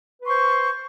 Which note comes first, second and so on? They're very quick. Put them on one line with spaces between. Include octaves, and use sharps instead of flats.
B4 C6 C#6 C5